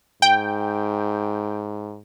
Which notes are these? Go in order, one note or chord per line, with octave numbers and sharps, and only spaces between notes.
G#2 G5